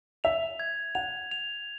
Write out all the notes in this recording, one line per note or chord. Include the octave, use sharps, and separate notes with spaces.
E5 F7
G#6
F#5 F7
F7